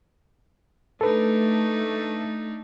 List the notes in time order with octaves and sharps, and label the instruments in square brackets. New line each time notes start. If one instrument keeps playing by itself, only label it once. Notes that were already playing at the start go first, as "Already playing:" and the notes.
[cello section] A3 [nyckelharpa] D4 D#4 [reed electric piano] A4 B4